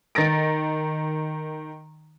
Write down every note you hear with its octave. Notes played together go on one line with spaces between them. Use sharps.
D#3 A6 A#6 D7